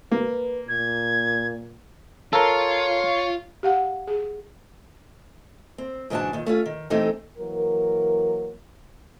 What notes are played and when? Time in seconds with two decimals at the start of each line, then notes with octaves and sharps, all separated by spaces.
0.11 A#3 B4
0.68 A#2 G#6
2.33 F4 A4 A#4 C#5
3.63 G4 F5 F#5
4.07 G#4
5.78 C4
6.10 G#2 C#3 E3 D4 F#4 A5
6.33 A#2 D#3
6.46 A3 C#4 F4
6.66 D#3
6.90 E3 A3 C4 D#4 G4 A4
7.38 E3 F#3 A#3 A#4